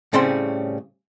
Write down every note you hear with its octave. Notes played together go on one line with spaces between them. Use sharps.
A2 C#3 G3 C4 C#4 C6